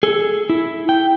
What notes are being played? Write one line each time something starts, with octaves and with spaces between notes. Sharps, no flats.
G#4 A4
E4
G5